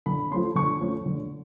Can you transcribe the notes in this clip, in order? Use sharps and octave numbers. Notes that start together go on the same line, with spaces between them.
D3 B5
F3 A3 C#4 C6
D3 C#6
F3 A3 C#4
D3